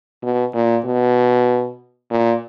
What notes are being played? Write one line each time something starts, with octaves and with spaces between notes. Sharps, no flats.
B2
A#2
B2
A#2